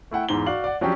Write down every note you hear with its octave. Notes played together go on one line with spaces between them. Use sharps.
A3 E4 F#5 G5
E2 G#2 G7
F#4 D5 F5 F#7
D5 F#5
F3 F#3 C#4 D4 G4